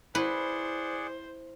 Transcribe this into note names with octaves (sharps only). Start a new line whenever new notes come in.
E4 G#4 B4 C5 D5 F#5